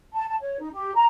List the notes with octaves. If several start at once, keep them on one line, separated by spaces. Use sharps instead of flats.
A5
A5
C#5
D#4
G4
A#5